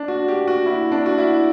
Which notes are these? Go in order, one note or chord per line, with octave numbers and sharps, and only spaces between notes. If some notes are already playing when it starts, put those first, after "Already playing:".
Already playing: D4
F#4
G4
F#4
E4
D4
F#4
E4